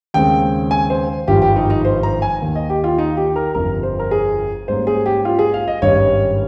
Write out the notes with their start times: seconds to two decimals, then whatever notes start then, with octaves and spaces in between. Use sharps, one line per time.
0.14 D#2 C#3 G#3 C4 G5
0.71 G#5
0.90 C5
1.28 G#1 G2 F3 G4
1.42 G4
1.56 D#4
1.70 D#4
1.85 C5
2.03 A#5
2.22 G#5
2.41 D#2 D#3 A#3
2.55 D#5
2.70 G4
2.84 F4
2.98 D#4
3.17 G4
3.36 A#4
3.55 G1 F2 C3 A#4
3.83 C5
3.99 A#4
4.11 G#4
4.68 G#2 G3 A#3 C#4 C5
4.87 G#4
5.06 G4
5.25 F4
5.39 G#4
5.54 F5
5.68 D#5
5.82 G#1 G2 G3 C#4 C#5